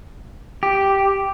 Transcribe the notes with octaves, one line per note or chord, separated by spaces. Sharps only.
G4